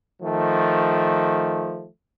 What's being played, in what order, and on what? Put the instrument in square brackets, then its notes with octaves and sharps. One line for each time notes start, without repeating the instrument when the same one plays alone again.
[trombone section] D#3 F3 A3